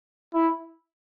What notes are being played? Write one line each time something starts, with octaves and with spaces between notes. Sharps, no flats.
E4